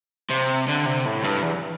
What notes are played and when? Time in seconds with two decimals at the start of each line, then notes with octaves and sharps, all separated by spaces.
0.29 C3
0.68 D3
0.86 C3
1.06 A2
1.24 G2
1.43 E2